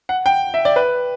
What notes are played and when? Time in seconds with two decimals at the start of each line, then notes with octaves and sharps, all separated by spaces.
0.09 F#5
0.26 G5
0.54 E5
0.65 D5
0.76 B4